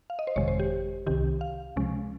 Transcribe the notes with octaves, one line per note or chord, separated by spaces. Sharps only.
F5
D#5
C5
G1 F2 C3 D#3 G#3 C#5
C5
G4
C2 C3 D#3 G4
F5
C#2 C3 F3 G#3 C#4